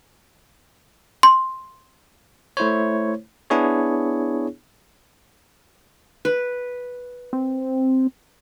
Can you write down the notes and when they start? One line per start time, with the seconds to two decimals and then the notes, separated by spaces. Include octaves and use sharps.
1.23 C6
2.57 A3 E4 C5 C#5
3.50 B3 D4 E4 G#4 C#5
6.25 B4
7.33 C4